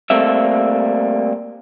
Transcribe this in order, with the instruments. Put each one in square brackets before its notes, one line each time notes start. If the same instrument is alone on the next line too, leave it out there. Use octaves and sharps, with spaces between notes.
[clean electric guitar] G3 A3 A#3 C4 E5